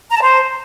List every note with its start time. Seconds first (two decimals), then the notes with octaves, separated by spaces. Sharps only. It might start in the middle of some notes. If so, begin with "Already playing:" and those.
0.10 A#5
0.16 A5
0.21 C5